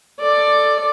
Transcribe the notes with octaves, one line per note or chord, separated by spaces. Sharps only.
A4 D5